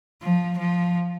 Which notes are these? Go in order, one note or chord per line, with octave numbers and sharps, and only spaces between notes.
F3
F3